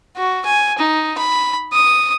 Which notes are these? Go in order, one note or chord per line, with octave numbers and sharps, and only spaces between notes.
F#4
G#5
D#4
B5
D#6